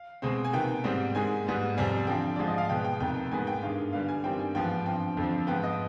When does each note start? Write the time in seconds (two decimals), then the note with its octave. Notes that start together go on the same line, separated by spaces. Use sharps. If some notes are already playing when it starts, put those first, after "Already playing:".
Already playing: F5
0.22 B2 G#3 C4
0.44 G#5
0.53 C3 D#3 B3 G5
0.84 G#2 G3 C4
1.15 G#2 D#3 G#3 G#5
1.47 G#2 G3 B3
1.77 F2 C3 G3 C4 G#5
2.07 D3 F3 C4 G5
2.36 G#2 F3 G#3 D5
2.48 D#5
2.58 F5
2.69 B2 G#3 B3 G5
2.85 G5
3.00 F2 C3 D#3 B3 G5
3.31 G#2 D#3 G#3 B3 G#5
3.47 G5
3.62 G2 D#3 G#3 F5
3.92 D3 G3 B3 F5
4.08 G#5
4.24 G2 D#3 G3 C4 G5
4.39 G#5
4.55 G#2 F3 B3 G5
4.86 G2 F3 C4 G5
5.17 F2 D3 F3 C4
5.47 G#2 F3 B3 G5
5.64 D#5